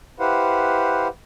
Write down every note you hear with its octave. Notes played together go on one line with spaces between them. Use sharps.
E4 G4 B4 C5 F5 F#5